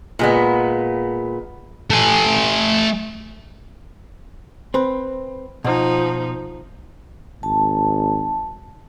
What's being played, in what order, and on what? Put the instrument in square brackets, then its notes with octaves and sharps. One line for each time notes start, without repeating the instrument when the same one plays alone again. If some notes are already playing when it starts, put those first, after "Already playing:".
[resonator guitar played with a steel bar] A#2 G#3 B3
[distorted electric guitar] A3 G#5
[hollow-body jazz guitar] C4 B4
[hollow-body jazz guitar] B2 [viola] F3 D#4
[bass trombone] G#1 [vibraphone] A5